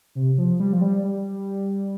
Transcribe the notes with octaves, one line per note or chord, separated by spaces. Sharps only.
C3
F3
G3
F3
G3
G3